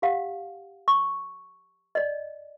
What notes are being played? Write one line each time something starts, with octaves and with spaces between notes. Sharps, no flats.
G4 F5 F#5
C#6
D5 D#5